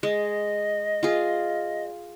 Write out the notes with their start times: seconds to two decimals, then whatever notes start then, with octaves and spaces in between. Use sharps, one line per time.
0.03 G#3 D#5
1.03 F4 G#4